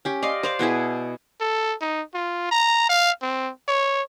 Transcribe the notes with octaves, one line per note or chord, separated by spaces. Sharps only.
C#4 G4
D5 D#5 F5 C6
C5 D5 F5
B2 B3 E4 G#4
A4
D#4
F4
A#5
F5
C4
C#5